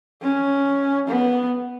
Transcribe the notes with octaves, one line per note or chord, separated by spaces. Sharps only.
C#4
B3